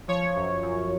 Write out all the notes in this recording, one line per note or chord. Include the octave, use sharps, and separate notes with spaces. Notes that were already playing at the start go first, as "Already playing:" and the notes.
F3 C#5
F#2
F#2